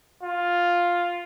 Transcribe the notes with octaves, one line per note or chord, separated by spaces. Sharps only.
F4